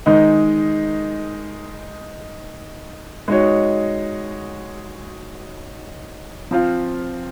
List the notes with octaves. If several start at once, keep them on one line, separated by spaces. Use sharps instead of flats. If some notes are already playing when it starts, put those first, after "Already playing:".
D#3 G#3 D#4
G#3 D#4 F#4 C#5
F3 C4 F4